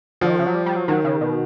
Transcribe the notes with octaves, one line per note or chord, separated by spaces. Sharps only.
D3 F3
D#3
C#3
F#3
G3
G3
F#3
D#3 F#3
C#3
B2